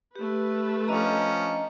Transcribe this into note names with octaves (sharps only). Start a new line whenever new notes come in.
A3 G4 B4
F3 C#4 D4 D#5 A#5